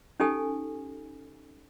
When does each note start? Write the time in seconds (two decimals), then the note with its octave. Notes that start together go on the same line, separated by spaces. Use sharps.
0.20 C#4 D#4 G4 A4 G#5